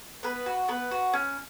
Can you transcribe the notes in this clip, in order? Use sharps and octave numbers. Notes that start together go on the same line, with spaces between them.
B3 B4
F#4
B3 B4
F#4
C#4